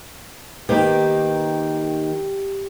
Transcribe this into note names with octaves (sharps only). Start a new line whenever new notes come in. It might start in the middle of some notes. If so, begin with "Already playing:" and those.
D#3 A#3 G4 B4